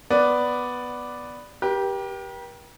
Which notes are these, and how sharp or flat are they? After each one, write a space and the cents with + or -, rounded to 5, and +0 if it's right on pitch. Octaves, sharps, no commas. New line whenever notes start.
B3 +0 D5 +0
G4 +0 A#4 +45